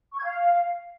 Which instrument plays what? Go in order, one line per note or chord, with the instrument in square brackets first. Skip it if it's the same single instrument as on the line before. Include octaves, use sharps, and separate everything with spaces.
[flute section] C#6
G#6
F5